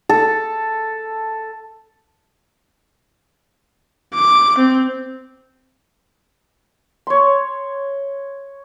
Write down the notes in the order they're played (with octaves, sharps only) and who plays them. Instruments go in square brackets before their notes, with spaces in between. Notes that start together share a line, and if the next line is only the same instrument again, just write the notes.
[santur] A4
[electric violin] D6
C4
[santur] C#5 C6